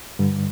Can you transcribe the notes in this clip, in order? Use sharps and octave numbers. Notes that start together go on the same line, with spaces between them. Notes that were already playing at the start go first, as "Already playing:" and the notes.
G2 D3 G3